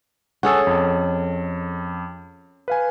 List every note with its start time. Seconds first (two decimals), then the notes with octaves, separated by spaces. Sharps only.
0.43 C#4 G#4 A4 F#5 E6
0.67 F2
2.68 B4 F5 G#5